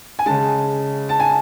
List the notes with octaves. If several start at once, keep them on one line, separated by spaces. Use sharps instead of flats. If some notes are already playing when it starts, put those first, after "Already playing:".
G#5
C#3 G#3 A5
A5
G#5